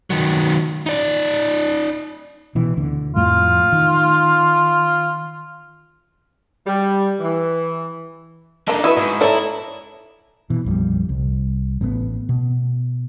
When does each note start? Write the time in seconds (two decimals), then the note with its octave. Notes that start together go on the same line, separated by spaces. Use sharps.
0.10 D#3 F#3
0.86 D#4 D5
2.55 B2 E3
2.77 D2 D3
3.16 F2 A2 F3 F4
3.72 D#3
6.66 G3
7.20 E3
8.68 A#3 D4 D#4 A4
8.84 F#3 E4 B4 D#5 E5 C#6
8.97 G#2
9.21 E4 A4 C#5 D5 A5 A#5
10.50 B2 E3
10.65 A#1 F2 G3
11.09 C2
11.81 A1 A2 C3 B3
12.29 B2